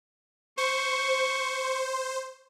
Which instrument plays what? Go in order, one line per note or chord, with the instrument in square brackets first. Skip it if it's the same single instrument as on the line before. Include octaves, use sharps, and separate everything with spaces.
[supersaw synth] C5 [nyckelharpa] C#6